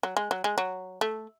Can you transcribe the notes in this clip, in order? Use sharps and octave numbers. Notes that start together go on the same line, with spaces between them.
F#3
G#3
F#3
G#3
F#3
A3